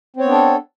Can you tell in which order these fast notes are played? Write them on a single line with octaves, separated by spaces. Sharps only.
C4 C#5 B3 D4 A4